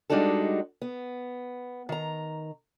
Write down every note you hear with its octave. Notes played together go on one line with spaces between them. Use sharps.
G3 G#3 D4 D#4 F#4 A4
B3
D#3 A#5